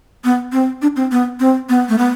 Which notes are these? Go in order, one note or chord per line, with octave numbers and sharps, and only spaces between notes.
B3
C4
D4
C4
B3
C4
B3
A3
B3